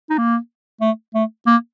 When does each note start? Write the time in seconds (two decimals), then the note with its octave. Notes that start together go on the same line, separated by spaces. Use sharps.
0.10 D#4
0.18 A#3
0.81 A3
1.14 A3
1.46 A#3